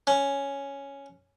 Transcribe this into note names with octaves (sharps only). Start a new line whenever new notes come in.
C#4